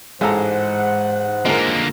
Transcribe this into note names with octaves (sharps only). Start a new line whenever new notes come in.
A1 G#2 G#3 A4 C5 F#5 A#5
D3 G#3 A#3 F4 A#4